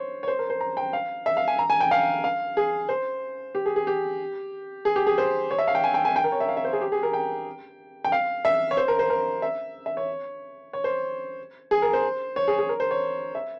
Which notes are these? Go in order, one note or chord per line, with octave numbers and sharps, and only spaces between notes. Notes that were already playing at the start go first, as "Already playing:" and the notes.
Already playing: C5 C#5
C#5
C5
A#4
C5
A#5
G5
F5
E5
F5
G#5
A#5
G#5
G5
F5
F5
G#4
C5
G4
G#4
G#4
G4
G#4
G4
G#4
C5
C#5
E5
F5
G5
G#5
G5
G#5
G5
A#4
C#5
E5
F5
E5
C5
G#4
G4
G#4
A#4
G5
G5
F5
E5
C#5
C5
A#4
C5
A#4
E5
E5
C#5
C#5
C5
G#4
A#4
C5
C#5
G#4
G#4
A#4
C5
C#5
E5